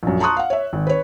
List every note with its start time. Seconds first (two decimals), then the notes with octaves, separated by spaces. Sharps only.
0.03 A#1 F#2
0.20 A5 A#5 C6 C#6 D#6 F#6
0.37 F5 F#5
0.50 C#5 E5
0.73 G#1
0.87 B4 C#5